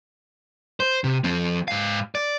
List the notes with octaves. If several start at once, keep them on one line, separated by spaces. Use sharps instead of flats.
C5
C3
F3 C4
G#2 F5
D5